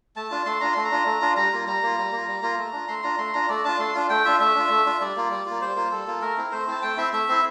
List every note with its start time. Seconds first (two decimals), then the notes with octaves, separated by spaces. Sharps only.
0.16 A3 A5
0.31 D4 F4
0.46 A3 C6
0.61 D4 F4 A#5
0.72 A3 C6
0.85 A#5
0.91 D4 F4
1.06 A3
1.22 D4 F4
1.36 G3 A#5
1.52 A#3 F4
1.67 G3 A#5
1.83 A#3 F4
1.98 G3
2.13 A#3 F4
2.28 G3
2.43 A#3 F4
2.58 A3
2.73 D4 F4
2.88 A3 C6
3.03 D4 F4 A#5
3.18 A3 C6
3.33 D4 F4 A#5
3.49 A3 D5
3.64 D4 F4 A5
3.79 A3 C6
3.95 D4 F4
4.10 A3 G5
4.25 D4 F4 E5
4.39 A3 E5
4.55 D4 F4
4.70 A3
4.86 D4 F4
5.01 G3 D5
5.16 A#3 F4
5.31 G3
5.46 A#3 F4
5.61 G3 C5
5.76 A#3 F4
5.91 G3 A4
6.07 A#3 F4
6.21 A3 A#4
6.38 C4 E4
6.52 A3 C5
6.68 C4 E4 A5
6.82 A3 G5
6.97 C4 E4 E5
7.13 A3 E5
7.29 C4 E4